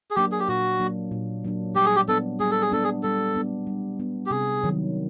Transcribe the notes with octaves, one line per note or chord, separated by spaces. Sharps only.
G#4
F#3 A#3 D4 G4
G#4
G4
A#2 F#4
F#3 A#3 D4
A#2
F#3 A#3 D4
G3 G4
G#4
G4
B3 D4 A4
G3 G#4
A4
G#4
B3 D4 A4
G#4
G3 A4
B3 D4
G3
B3 D4
G4
C3 G#4
D#3 F#3